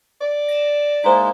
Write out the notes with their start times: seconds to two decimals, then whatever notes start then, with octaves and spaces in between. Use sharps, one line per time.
0.21 D5
0.48 A#6 E7
1.04 G#3 A#3 D#4 E4 C5